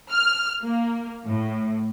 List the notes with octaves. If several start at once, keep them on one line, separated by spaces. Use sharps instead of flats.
F6
A#3
A2